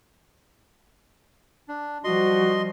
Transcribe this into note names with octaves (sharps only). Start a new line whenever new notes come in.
D4
F3 G3 F#4 D#5 C6